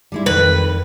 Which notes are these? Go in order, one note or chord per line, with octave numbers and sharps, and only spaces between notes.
G3 G#3 E4
F2 D#3 B4